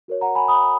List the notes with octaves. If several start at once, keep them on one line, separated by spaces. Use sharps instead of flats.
F#4 A#4 C#5
F#5 A#5
G#5 B5
B5 D#6